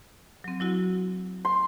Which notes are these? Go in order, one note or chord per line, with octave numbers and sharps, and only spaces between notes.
F#3 C4
F#3 E4 F#4
C6